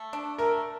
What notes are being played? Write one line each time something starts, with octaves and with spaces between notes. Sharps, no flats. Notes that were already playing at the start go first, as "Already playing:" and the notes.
Already playing: A3
D4
A3 A#4